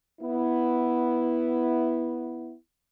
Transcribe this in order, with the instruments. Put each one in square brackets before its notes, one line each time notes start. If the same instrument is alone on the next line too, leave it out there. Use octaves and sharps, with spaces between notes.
[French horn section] B3 E4